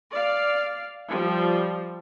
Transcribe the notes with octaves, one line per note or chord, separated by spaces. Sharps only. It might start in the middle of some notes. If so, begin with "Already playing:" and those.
D5 F5
F3 G3